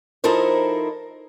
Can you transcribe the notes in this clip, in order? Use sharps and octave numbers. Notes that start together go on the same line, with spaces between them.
F3 D#4 E4 A4 A#4 C5